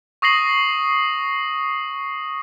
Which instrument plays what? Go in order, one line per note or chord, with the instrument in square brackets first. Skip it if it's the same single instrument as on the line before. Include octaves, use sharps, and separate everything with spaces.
[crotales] C#6 D#6 A#6 C7 F#7